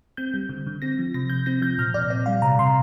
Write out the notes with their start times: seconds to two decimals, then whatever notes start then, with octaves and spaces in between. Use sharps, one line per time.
0.17 C4 G6
0.34 G3
0.49 D3
0.66 D3
0.82 C4 A#6
0.98 F3
1.14 C3 A#6
1.30 C3 G6
1.46 C4 A#6
1.62 F3 G6
1.78 A#2 F6
1.94 A#2 D5
2.10 C4 D5
2.26 G3 F5
2.42 C3 A#5
2.59 C3 C6